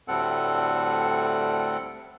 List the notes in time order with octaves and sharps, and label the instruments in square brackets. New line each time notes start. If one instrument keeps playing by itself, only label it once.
[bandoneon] D2 A2 G3 C4 A4 F#5